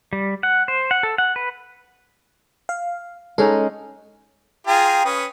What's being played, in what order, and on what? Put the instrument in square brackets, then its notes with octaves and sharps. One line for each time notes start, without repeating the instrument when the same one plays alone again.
[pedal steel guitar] G3
F#5
C5
F#5
A4
F#5
B4
[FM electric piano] F5
[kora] G#3 C#4 D#4 [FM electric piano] A4
[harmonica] F4 G#4 A#5 [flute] G5
[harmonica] C#4 B4 D#6